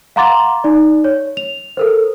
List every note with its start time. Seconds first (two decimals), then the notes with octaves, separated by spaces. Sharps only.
0.16 F5 F#5 A#5 C6 D6 A6
0.64 D#4 D5
1.04 C#5
1.37 F7
1.77 A4 A#4 C5